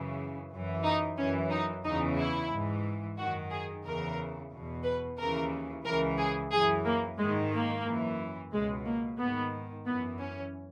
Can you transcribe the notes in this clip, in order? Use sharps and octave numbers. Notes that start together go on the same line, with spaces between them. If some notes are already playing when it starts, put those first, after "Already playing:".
Already playing: F#2 C#3 E3
F#2 E3
D#4
F#2 E3 C#4
D#4
E2 C#3 E3 D#4
E4
G#2 E3
F#2 D#3 F#4
G#4
E2 C#3 E3 A#4
E2 B2
B4
D#2 C#3 E3 A#4
C#2 C#3 E3 A#4
G#4
F#2 E3 G#4
A#3
G#2 D#3 G#3
A#3
F#2 E3
C#2 B2 G#3
A#3
G#2 D#3 B3
F#2 E3 B3
C#4